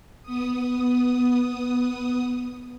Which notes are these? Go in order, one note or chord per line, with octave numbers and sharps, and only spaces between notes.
B3 D#6